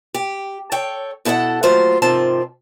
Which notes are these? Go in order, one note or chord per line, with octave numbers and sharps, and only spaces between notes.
G4
A4 C#5 G5
B2 E4 A4 C#5 F#5
D#2 F#3 A3 F4 C5
G#2 C3 D#3 F3 C4 A5